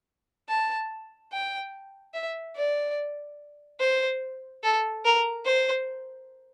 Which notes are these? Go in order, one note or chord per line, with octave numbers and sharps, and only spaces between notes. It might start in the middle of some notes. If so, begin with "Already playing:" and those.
A5
G5
E5
D5
C5
A4
A#4
C5